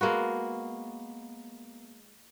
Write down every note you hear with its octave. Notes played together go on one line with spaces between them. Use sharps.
G#3 A#3 B3 F#4